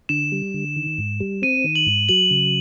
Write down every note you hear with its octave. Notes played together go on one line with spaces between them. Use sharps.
D3 E7
G3
D3
D#3
G#2
G3
C4 D#7
D#3
F#7
G#2
F#3 F#7
C#3